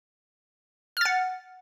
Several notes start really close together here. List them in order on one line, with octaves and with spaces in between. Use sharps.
F6 A6 F#5